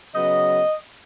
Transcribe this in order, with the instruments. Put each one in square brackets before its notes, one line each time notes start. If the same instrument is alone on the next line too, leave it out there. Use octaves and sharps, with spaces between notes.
[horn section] C#3 F#3 B3 D#5